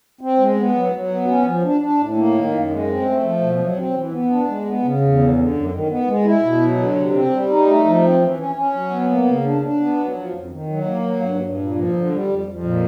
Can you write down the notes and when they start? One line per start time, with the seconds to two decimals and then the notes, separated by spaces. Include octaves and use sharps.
0.21 C4
0.39 G#3
0.57 B3
0.74 F#3
0.92 F#3
1.10 B3
1.28 C#4
1.46 F3
1.63 D4
1.81 D4
1.99 A2
2.17 A#3
2.34 D#3
2.52 F#2
2.70 G#3
2.87 C4
3.05 A3
3.23 F3
3.41 B2
3.58 F#3
3.76 C4
3.94 E3
4.12 B3
4.30 D4
4.47 G#3
4.65 B3
4.83 C#3
5.00 E2
5.18 D3
5.36 D3
5.54 F#2
5.72 D#3
5.89 B3
6.07 G#3
6.25 E4
6.42 B2
6.60 F#3
6.77 D3
6.96 C3
7.13 C4
7.31 G3
7.49 D#4
7.66 A3
7.84 F3
8.02 C4
8.20 E3
8.38 C#4
8.55 C#4
8.74 F#3
8.91 B3
9.09 A#3
9.27 C#3
9.44 D4
9.61 D4
9.80 B3
9.98 F#3
10.15 F3
10.33 F2
10.50 D#3
10.68 F#3
10.86 A#3
11.04 F#3
11.21 G2
11.40 G2
11.57 A#2
11.75 F3
11.93 D3
12.10 G3
12.28 F2
12.46 F2
12.63 A#2